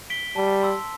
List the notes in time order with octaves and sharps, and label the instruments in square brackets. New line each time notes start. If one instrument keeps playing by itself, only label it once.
[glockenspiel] B6 D7 G7
[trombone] G3 [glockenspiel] A5
[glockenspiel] C6 E6